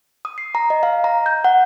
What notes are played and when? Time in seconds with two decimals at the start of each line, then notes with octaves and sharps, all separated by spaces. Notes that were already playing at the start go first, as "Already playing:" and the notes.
0.25 D#6
0.38 C7
0.55 A#5
0.70 D#5
0.83 F5
1.04 A#5
1.26 G6
1.44 F#5